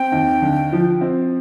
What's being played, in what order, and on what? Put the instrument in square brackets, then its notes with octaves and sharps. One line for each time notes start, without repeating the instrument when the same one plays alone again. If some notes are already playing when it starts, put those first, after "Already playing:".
Already playing: [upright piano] C4 [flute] G5
[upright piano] D#2
D3
F3
C4